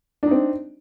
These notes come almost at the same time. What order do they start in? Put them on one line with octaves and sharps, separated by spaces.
D4 D#4 C4